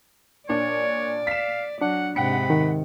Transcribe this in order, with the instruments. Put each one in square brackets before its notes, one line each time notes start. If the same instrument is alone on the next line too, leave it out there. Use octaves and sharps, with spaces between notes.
[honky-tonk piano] A#2 D4 [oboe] C#5 [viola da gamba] D5
[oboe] F5 [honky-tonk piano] B6 E7
[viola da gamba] F#3 [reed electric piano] D4 [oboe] F#5
[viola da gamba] G#2 C3 [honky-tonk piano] F#5 G5 C#7 [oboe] B5
[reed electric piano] D#3